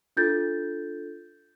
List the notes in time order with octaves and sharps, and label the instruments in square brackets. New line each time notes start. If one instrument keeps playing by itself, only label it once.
[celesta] D4 F4 A4 G6 A6